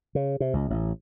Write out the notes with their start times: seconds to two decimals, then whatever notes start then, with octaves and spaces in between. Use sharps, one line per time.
0.15 C#3
0.40 C3
0.53 C#2
0.70 A1